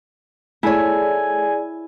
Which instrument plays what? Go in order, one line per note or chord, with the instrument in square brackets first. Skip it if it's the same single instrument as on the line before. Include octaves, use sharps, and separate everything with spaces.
[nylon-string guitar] A3 C#5 [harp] E4 [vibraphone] G#4 D5 [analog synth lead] G#5